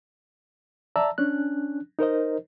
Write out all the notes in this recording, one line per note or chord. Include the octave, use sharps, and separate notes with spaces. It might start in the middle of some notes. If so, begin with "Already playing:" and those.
D5 E5 A5 A#5 E6
C#4 D4 F#6
D#4 A#4 C5 D#5